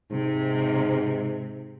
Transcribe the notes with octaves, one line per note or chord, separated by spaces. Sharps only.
G#2 C3